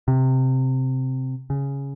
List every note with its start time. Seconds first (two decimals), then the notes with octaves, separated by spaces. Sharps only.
0.08 C3
1.50 C#3